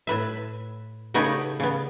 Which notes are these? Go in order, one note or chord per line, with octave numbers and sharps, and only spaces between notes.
A2 B4 E5
C#3 A3 B3 D#4 G4 C#5
C#3 B3